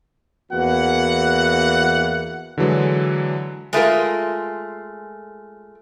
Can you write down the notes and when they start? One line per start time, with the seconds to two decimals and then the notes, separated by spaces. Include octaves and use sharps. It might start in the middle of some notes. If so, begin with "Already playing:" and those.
0.52 E2 E3 A#3 F#4 F#5
2.58 D3 E3 F#3 G#3
3.73 G#3 A3 F4 A#4